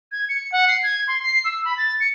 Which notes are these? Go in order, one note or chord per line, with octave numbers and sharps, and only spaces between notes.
G#6
C#7
F#5
C7
G#6
C6
C7
E6
B5
A6
C#7